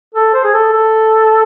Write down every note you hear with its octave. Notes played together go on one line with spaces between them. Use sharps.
A4
C5
G#4
A4
A4